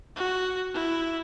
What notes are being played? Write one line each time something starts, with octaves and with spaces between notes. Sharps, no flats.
F#4
E4